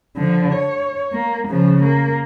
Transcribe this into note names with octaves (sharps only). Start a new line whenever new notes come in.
D3 F3
C#5
A#3
C#3 F3
A#3